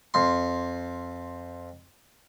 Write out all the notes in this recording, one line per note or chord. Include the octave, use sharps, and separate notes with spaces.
F2 C6